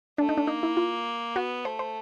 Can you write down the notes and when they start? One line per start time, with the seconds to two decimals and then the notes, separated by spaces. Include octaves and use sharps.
0.18 A3 D4
0.29 D#4
0.38 D4
0.47 A#3 D#4
0.63 E4
0.77 F4
1.36 B3 F#4
1.65 A3 C5
1.79 C5